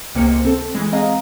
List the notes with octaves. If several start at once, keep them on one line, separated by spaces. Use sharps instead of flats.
C#2 C3 A#3 C5 C#7
C4 A4
E3 G#3
G#3 C4 G#4 D#5 F5 A#5